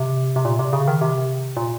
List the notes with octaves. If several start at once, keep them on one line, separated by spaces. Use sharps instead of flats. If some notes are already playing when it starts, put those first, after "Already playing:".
Already playing: C3
C3
A#2
C3
C#3
D#3
C3
A#2